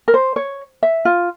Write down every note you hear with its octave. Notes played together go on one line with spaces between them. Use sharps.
A#4
C5
C#5
E5
F4